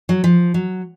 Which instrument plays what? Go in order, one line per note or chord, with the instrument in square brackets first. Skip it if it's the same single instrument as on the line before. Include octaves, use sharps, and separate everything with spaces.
[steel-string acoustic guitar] F#3
F3
F#3